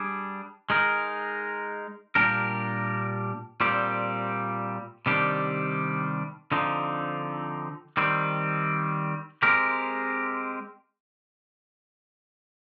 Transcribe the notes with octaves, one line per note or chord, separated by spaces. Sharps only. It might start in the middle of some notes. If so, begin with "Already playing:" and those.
Already playing: G3 D4 G#4
G#3 D#4 A#4
A#2 G3 D4 G4 A#4
A#2 G3 C4 G4
C3 D#3 G3 D4 G4
D3 F3 C4 D#4
D#3 G3 C4
G#3 C4 G4 A#4